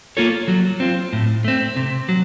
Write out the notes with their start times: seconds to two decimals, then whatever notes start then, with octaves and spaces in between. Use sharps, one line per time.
0.17 A#3 F4 A4 C#5
0.48 F#3
0.80 C4 F4
1.13 A2
1.44 A3 C4
1.76 C3
2.09 F#3